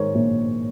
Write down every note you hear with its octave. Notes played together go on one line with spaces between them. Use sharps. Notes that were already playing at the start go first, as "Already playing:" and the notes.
Already playing: G#2 D#3 G#3 A#4 C5 C#5
A#1